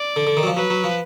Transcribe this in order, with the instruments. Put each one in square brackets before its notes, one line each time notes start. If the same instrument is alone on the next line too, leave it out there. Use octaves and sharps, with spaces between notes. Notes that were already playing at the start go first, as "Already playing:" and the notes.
Already playing: [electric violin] D5
[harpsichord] D3
D3
D#3
F#3
F3
[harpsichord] F#3 [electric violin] B4
[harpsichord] F#3
F3